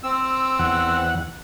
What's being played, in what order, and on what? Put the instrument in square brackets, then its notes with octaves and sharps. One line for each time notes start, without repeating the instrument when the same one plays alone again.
[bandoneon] C4 E6
[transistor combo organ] E2 F#5